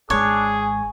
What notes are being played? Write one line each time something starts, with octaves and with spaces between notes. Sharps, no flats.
G#1 G#3 D4 G#4 C#5
G#5